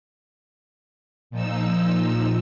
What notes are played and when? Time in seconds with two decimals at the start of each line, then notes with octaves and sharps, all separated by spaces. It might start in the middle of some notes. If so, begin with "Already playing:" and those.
1.30 A#2 F3 D#4 E6